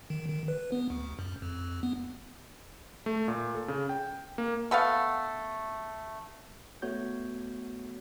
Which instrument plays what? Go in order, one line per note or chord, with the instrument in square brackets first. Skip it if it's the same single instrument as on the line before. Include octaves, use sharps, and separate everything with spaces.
[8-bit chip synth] D#3
D#3
B4
B3
D2
F#2
F2
B3
[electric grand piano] A3
A#2
A4
C#3
G5
A#3
[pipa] A3 B3 A4 F5
[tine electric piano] A3 B3 F#4 C#5 G6